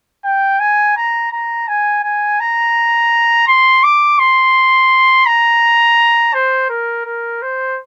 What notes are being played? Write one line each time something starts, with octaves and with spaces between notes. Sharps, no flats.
G5
G#5
A#5
A#5
G#5
G#5
A#5
C6
D6
C6
A#5
C5
A#4
A#4
C5